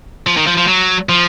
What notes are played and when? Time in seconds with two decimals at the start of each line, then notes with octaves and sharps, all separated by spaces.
0.26 F3
0.37 D#3
0.47 F3
0.57 F3
0.67 F#3
1.09 F3